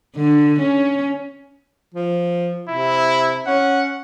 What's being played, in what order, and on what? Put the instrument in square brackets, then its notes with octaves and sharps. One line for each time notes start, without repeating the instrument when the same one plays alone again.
[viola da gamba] D3
C#4
[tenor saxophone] F3
[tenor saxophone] C3 [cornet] E4
[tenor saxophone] C#4 [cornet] F#5